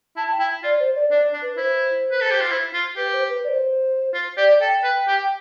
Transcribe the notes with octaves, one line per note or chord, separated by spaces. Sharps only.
E4 A5
G5
E4
F4 D5
C5
D5
D4 D5
D4
B4
E4 C5
B4
A4
G4
F4
E4
F4
G4 B4
C5
B4
D5
C5
F4
G4 D5
A4 G5
B4
G4